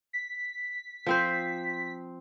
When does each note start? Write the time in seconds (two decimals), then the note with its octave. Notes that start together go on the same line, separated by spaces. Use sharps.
0.13 B6
1.07 F3 C4 C5